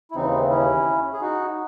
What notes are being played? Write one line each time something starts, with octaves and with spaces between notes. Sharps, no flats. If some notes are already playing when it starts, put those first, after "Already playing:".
E4
D#2 C#3 E3 C4 D#4
C#4 E4
G#4
D#4 F#4